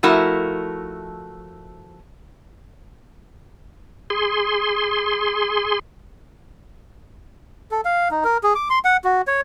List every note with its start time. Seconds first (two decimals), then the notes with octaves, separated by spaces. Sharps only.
0.03 F3 A3 E4 F#4 A#4
4.10 G#4 C6
7.71 A4
7.85 F5
8.11 D#4
8.24 A#4
8.43 G#4
8.55 D6
8.70 C6
8.85 F#5
9.04 F#4
9.27 C#5